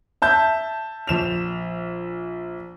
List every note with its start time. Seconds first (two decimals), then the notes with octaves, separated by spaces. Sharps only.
0.22 E5 A5 G6
1.07 A#1 E7 F7